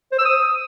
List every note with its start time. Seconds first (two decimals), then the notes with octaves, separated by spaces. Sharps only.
0.12 C5
0.19 E6
0.25 D#6